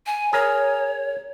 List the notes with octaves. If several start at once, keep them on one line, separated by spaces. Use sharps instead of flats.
G#5
G#4 A#4 C#5